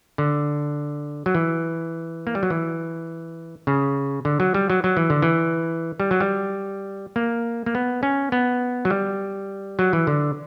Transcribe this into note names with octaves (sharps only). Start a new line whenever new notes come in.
D3
F#3
E3
A#3
G3
F#3
E3
C#3
D3
F#3
G3
F#3
F#3
E3
D3
E3
G3
F#3
G3
A#3
A#3
B3
C#4
B3
F#3
G3
F#3
E3
D3